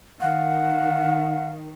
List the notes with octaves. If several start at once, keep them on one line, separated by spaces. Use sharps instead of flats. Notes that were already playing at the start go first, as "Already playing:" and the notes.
D#3 F5 F#5